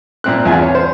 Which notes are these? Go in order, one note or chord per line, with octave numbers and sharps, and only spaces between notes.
A#2 C4 F#6
E2 F4 G#5
C#5
C5